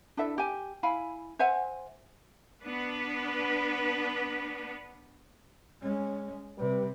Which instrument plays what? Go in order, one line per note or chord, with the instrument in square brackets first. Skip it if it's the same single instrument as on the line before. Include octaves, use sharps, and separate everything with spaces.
[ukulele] D4 E4 A4 E5
G4 G#5
E4 F5 G#5 B5
C5 E5 F#5 G#5
[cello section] B3 D4 B4
[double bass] G#3 C#4
[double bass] C3 [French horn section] G3 B4